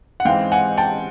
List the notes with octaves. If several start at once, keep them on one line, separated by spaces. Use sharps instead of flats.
F#5
G#2 E3 G#3 C4 F5 G5
F#5 G#5
G5 A5